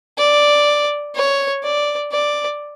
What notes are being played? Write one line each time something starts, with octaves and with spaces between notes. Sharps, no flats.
D5
C#5
D5
D5